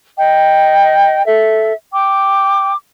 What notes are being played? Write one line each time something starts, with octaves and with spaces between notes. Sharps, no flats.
D#5 G5
A4 E5
G5 D6